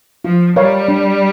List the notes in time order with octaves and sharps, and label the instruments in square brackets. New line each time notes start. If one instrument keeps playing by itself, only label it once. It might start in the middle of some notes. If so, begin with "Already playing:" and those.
[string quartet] F3 [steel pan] F4
[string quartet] G3 [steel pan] A#4 C#5 F5
[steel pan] D4